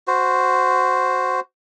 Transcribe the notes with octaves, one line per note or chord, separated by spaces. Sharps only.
F#4 C5